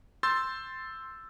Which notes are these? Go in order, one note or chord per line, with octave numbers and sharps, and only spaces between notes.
C6 E6 G6 A6